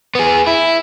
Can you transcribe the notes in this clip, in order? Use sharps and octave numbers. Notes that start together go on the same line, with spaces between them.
B3 G#4
E4